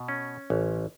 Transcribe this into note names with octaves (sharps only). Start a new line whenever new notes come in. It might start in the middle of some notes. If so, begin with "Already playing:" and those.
Already playing: B2
C#4
A1